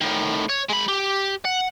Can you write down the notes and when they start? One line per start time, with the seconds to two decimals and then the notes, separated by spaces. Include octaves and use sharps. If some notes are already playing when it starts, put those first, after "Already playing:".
0.01 A2 D#3
0.49 C#5
0.69 G#3 B5
0.88 G4
1.45 F#5